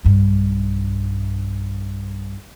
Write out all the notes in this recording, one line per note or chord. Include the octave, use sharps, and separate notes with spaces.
B1 G2